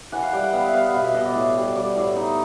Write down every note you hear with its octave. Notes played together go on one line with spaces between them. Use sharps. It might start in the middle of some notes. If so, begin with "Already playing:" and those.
E3 F#5
F5
G3 G5
F#5
B3 F5
E5
B3 F5
F#5
B2 F5
E5
B2 D#5
D5
A2
G3
G3 D5
A2
D#4